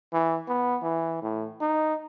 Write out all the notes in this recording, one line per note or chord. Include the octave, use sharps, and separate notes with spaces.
E3
B3
E3
A2
D#4